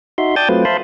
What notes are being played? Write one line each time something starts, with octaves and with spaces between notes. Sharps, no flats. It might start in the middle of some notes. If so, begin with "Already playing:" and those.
D#4 F#4 E5 C6
D5 G5 A5 D#6 G6 A6
F#3 A3 C4 F4 B4
C5 E5 F5 A5 B5 C6